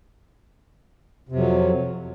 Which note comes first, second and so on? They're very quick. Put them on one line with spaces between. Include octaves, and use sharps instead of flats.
C3 F2 F#3